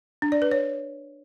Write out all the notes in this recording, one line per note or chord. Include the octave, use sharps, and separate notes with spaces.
D4
D5
B4
C#5